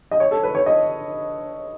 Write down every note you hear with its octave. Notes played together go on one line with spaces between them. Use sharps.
D#5
C#5
A4
B4
C#5
D#5